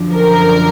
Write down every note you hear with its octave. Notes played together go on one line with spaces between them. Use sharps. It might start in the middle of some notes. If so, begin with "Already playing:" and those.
Already playing: F#2 D3 F3
A#4